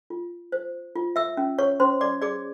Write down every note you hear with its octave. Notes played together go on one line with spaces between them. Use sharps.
F4
C5
F4
E5 E6
C#4
C#5 C#6
C#4 C5 C6
D5 D6
G#4 D5 D6